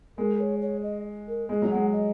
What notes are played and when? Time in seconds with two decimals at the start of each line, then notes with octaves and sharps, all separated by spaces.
0.17 G#3 A#4
0.35 A#4
0.40 C#5
0.61 C#5
0.83 D#5
1.27 A#4
1.49 G#3 D#5
1.62 F#3
1.71 G#3 F#5
1.93 D#5